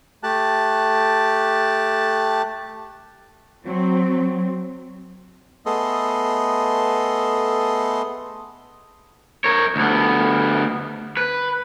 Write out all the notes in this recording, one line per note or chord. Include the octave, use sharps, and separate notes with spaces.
A3 G4 A5 F#6
F#3 C4
A3 B3 G#4 A4 D#5 C6
A#4 C#5
D2 B3
B4